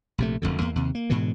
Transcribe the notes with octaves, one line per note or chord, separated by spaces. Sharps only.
A#1 C3 A3
E1 C2 F2 D3
E2 A#3
D#2 C3
A#3
G#2 B2 D3 E3